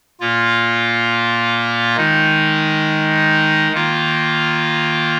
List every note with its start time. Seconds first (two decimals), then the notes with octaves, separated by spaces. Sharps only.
0.20 A#2 A#3 F4
1.97 D#3 G#3 D#4
3.72 D#3 A#3 F4